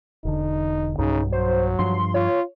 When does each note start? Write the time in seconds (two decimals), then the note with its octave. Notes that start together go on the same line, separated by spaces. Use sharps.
0.25 E1 D3 D#4
0.99 B1 G2 C#3 D#4
1.32 F#3 C5
1.79 G2 F3 D4 C6
2.14 F4 C#5